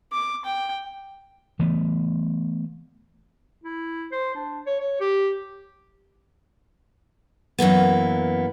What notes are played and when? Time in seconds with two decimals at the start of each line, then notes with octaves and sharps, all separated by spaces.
0.12 D6
0.45 G5
1.59 E3 A3 B3
3.64 E4
4.12 C5
4.35 D4
4.66 C#5
4.80 C#5
5.01 G4
7.58 F#2 E3 A#3 B3